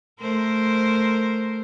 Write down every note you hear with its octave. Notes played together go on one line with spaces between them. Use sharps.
A3 A#4 C5